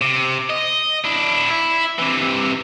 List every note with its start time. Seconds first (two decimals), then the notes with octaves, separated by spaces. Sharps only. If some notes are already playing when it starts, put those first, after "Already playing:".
0.01 C3
0.50 D#5
1.04 D4 E4
1.50 E4
1.99 C3 E3